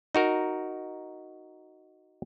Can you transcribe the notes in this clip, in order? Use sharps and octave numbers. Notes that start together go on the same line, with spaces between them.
D#4 F#4 A#4